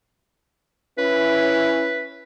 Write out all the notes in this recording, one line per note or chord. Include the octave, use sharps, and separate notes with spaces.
C#4 E4 B4